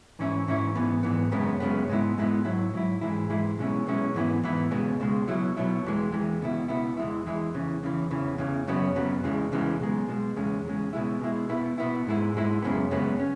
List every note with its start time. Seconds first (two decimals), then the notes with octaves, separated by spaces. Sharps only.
0.19 G#2 E3 C#4 E4
0.48 G#2 E3 C#4 E4
0.75 G#2 E3 B3
1.03 G#2 E3 B3
1.32 F#2 C#3 G#3 B3
1.60 F#2 C#3 G#3 B3
1.88 G#2 G#3 B3 E4
2.17 G#2 G#3 B3 E4
2.45 G#2 F#3 E4
2.74 G#2 F#3 E4
3.01 G#2 E3 G#3 E4
3.29 G#2 E3 G#3 E4
3.57 B1 B2 G#3 C#4 E4
3.86 B1 B2 G#3 C#4 E4
4.14 G#2 E3 B3 E4
4.43 G#2 E3 B3 E4
4.71 C#2 B2 G#3
5.00 C#2 B2 G#3
5.27 B2 F#3 E4
5.57 B2 F#3 E4
5.84 E2 E3 G#3
6.12 E2 E3 G#3
6.40 C#2 B2 B3 E4
6.68 C#2 B2 B3 E4
6.97 E2 E3 G#3 E4
7.26 E2 E3 G#3 E4
7.54 E2 C#3 E3
7.83 E2 C#3 E3
8.11 E2 C#3 E3
8.38 E2 C#3 E3
8.67 F#2 C#3 F#3 B3
8.95 F#2 C#3 F#3 B3
9.24 E2 C#3 E3 G#3
9.52 E2 C#3 E3 G#3
9.80 B1 B2 G#3
10.08 B1 B2 G#3
10.36 E2 C#3 G#3
10.65 E2 C#3 G#3
10.93 B2 G#3 E4
11.21 B2 G#3 E4
11.49 B2 B3 E4
11.78 B2 B3 E4
12.07 G#2 G#3 E4
12.34 G#2 G#3 E4
12.62 F#2 C#3 G#3 B3
12.91 F#2 C#3 G#3 B3
13.20 C#4